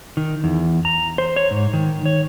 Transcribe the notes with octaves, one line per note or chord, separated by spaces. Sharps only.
D#3
E2
A#5
C5
C#5
G#2
D#3
C#5